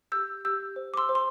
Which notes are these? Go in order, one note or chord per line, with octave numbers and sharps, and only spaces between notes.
G4 E6 G6
G4 E6 G6
C5
D6
C6 E6
C5
C6